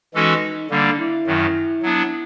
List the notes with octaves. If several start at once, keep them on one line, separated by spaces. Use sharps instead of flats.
E3 G#3 C#4 D#4 F#4 A4
D3 G3 A#3 D4
E4
F#2 D#3 F#3
F#3 B3 D4